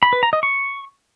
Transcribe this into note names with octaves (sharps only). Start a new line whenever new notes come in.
B5
B4
A#5
D#5
C#6